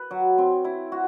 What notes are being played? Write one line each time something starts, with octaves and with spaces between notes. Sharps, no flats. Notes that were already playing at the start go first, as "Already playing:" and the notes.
Already playing: B4
F#3
C4
E4
F#4